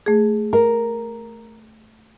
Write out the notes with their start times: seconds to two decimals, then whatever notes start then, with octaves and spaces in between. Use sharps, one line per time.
0.06 A3 G#4
0.53 A#4